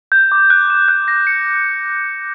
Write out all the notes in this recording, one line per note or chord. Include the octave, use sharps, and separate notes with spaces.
G6
D6
F#6
E7
F#6
A#6
C#7